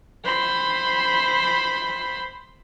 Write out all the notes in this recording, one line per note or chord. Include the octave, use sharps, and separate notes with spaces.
C5 B5